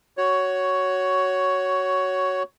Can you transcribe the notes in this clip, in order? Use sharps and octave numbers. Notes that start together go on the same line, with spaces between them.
F#4 C#5